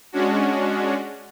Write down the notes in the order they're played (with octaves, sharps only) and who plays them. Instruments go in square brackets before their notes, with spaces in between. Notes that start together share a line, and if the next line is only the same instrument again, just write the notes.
[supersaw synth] G#3 C#4 D4 F#4